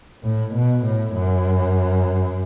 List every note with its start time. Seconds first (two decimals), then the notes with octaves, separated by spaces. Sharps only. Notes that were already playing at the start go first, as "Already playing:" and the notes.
0.23 A2
0.54 B2
0.85 A2
1.14 F#2